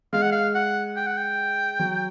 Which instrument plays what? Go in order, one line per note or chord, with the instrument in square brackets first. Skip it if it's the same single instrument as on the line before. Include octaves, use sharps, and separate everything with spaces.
[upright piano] G#3 [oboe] F5
[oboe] F#5
F5
F#5
G5
F#5
G5
[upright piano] F#3